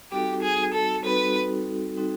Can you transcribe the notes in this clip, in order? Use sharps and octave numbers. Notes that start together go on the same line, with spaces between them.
G3 C4 D#4 F#4 G4 A4
G#4
A4
G3 C4 D#4 F#4 A4 B4
G3 C4 D#4 F#4 A4